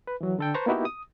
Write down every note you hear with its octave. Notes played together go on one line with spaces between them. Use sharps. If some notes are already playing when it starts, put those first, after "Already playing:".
B4
E3 F#3
D3 A4 G5
B4 C5 A5 A#5 C#6
A#3 B3 D#4 E4 F#4 G4
D#6